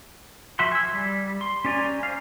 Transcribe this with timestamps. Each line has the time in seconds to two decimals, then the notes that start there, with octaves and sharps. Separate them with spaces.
0.59 F3 F#4 E5 F#5 C6
0.72 G#5 E6
0.93 G3
1.41 C6
1.65 C#4 G4 D5 G#5 A#5
2.03 C5 F5